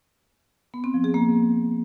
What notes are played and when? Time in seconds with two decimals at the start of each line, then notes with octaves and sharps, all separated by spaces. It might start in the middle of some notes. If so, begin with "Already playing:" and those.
0.74 B3
0.84 C4
0.94 F3
1.04 G#4
1.14 A#3